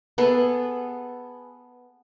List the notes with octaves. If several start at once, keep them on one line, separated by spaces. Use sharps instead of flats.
B3 G#4 A4 B4